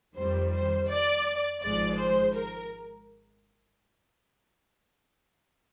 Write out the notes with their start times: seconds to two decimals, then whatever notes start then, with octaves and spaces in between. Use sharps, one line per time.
0.16 F2 D#3 G3 C5
0.53 C5
0.89 D5
1.62 G#1 G#2 F3 G#3 D5
1.98 C5
2.34 A#4